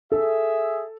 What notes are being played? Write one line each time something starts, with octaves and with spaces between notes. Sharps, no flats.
G#4 A4 E5